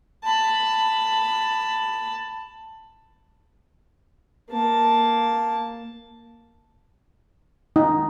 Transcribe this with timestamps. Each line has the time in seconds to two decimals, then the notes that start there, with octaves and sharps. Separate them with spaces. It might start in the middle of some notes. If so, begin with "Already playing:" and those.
0.24 A5 B5
4.50 A#3 A5
7.76 D#4